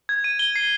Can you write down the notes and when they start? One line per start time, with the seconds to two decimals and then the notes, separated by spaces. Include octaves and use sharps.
0.09 G#6
0.24 D#7
0.39 G7
0.56 C7